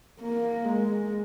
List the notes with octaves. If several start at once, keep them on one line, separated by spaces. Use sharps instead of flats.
A#3
G#3